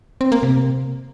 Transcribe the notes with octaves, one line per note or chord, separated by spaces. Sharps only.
C4
A#3
C3